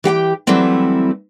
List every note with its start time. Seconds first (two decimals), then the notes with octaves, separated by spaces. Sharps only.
0.04 E3 G4 F#5 G5
0.47 E3 F#3 G3 A3 C4 E4